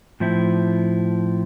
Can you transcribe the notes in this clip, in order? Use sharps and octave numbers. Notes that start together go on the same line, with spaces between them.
A2 F3 C4 E4